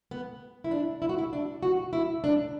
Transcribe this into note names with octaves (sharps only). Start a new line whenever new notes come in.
B3
E4
D4
E4
F#4
E4
D4
F#4
E4
D4